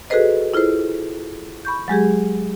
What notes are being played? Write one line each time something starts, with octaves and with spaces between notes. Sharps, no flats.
F#4 G#4 A4 B4 C5 D#5
E4 F4 G#4 A4 C5
B5 C#6 G6
F#3 G#3 G4 G#4